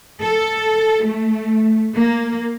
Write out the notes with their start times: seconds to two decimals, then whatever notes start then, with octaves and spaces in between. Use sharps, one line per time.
0.21 A4
1.02 A3
1.95 A#3